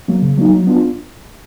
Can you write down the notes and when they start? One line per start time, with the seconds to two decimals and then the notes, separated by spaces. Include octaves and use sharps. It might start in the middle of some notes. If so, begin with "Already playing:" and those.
0.08 F#3 A#3
0.22 C#3
0.38 F#3 A#3 D#4
0.52 F#3
0.67 B3 D4 F4